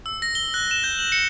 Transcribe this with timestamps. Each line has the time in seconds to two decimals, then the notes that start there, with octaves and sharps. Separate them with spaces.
0.06 E6
0.22 A#6
0.35 G7
0.54 F#6
0.71 E7
0.84 G6
0.99 F#7
1.12 C#7